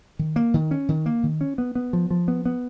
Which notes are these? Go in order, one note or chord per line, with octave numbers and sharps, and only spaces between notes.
D#3
A#3
D#3
C#4
D#3
A#3
D#3
C#4
B3
B3
F3
F3
B3
B3